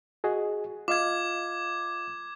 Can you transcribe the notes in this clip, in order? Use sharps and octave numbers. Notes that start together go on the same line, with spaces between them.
F#4 G#4 D#5
F4 D#5 F5 D6 G#6